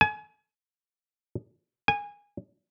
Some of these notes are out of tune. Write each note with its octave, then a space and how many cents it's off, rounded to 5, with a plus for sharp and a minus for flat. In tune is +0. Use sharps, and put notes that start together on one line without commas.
G#5 +30
G#5 -20